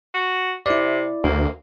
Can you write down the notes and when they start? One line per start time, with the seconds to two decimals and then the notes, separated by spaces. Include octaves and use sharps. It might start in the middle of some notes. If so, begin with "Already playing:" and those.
0.14 F#4
0.66 C3 E4 D5
1.24 D2 A#3